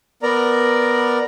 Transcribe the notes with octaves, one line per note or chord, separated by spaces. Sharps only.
B3 A#4 D5 A#5